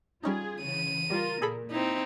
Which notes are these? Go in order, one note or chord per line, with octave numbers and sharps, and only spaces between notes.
G3 C#4 D#4 F4 G#4
C#3 E3 D#7
G3 F4 A#4
A#2 G#4 A4 B5
C4 D#4 E4